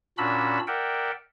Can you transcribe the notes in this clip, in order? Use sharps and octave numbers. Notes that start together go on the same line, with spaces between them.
A#2 C#4 D4 F#4 B5 E6
A#4 D5 E5 F#5 G5